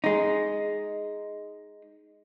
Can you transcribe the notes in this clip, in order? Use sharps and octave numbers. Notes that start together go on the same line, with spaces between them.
G#3 D#4